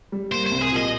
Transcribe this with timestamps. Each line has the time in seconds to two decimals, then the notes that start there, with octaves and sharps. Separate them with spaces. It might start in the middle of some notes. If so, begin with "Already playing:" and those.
0.12 G3
0.32 A#3 C5
0.47 C5
0.52 C2
0.62 G#4
0.72 A#2 D#5